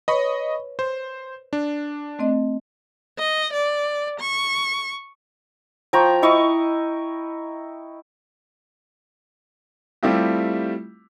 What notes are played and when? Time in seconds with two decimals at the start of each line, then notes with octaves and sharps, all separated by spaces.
0.08 B4 C#5 D#5 B5 C#6
0.79 C5
1.53 D4
2.19 A3 C4 D#5
3.18 D#5
3.53 D5
4.20 C#6
5.93 F3 G5 A#5 C#6
6.22 E4 D#5 C#6
10.03 G3 A3 C4 E4 F4 G4